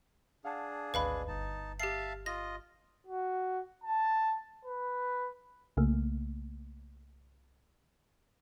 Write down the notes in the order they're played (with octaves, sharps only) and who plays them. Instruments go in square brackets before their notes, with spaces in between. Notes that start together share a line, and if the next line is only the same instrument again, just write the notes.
[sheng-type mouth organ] D4 G#4 [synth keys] F5 F#5 A5
[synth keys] G#1 D2 D#5 [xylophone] B4 F5 B5
[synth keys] G1 [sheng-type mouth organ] D#4 A5
[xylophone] G4 C7 [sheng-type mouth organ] E5 F5 A5
[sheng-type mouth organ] F4 D#5 [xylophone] A#6
[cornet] F#4
A5
B4
[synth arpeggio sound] C2 C#3 A3 A#3